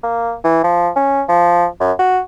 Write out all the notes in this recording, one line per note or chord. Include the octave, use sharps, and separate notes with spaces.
A#3
E3
F3
C#4
F3
F#2
F#4